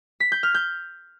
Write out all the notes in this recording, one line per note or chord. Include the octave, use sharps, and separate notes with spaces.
B6
G6
F6
G6